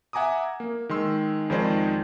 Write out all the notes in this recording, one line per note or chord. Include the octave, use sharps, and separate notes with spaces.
E5 F#5 G#5 A#5 D6 D#6
A#3
D#3 G#3 C6 E6
F2 D#3 G#3 D#4 C5 D5